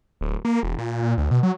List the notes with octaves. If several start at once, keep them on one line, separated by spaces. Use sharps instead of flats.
D1
A#3
E1
A#2
A#2
D2
B2
F#3